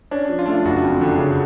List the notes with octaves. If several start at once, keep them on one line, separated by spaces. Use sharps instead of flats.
C#4 D4
F3
F4
A3 D4
F4
F#1 F#4
F2
D3
C#3